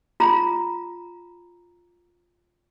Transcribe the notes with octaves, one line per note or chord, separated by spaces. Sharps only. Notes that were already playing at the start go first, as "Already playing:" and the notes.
F4 A#5